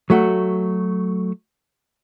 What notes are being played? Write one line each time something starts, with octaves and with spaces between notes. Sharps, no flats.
F#3 A3 F#4